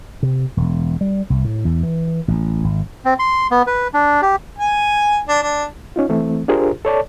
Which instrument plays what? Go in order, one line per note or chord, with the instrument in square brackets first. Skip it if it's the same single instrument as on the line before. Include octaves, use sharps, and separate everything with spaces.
[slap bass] C3
E1
G3
C2
A2
E2
E3
A1
G#1
[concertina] C4
C6
B3
B4
D4
G4
[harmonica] G#5
D4
D4
[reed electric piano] C#4 D#4 F4
E3 A3 C4
D4 F4 G4 G#4 A#4 C5
A4 C#5 D5 A5